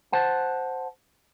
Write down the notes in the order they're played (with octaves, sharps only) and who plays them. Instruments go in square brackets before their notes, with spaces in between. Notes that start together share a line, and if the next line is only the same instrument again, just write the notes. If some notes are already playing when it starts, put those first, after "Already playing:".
[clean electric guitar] C5 F#5 A5